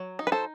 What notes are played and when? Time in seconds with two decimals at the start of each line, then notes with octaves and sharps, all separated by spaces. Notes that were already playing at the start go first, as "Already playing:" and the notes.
Already playing: F#3
0.19 D#4
0.27 B4
0.32 A4 C5